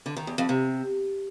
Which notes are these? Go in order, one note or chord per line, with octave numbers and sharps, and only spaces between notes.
D3
D#3
E2
F2
C3